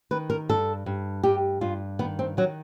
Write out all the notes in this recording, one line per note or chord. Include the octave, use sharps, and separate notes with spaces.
D#3 B4
A#4
G2 A4
G2
G2 G4
G2 F4
D#3 B3
C4
D#3 F#3